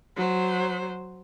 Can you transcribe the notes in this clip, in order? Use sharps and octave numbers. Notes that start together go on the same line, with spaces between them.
F#3 C5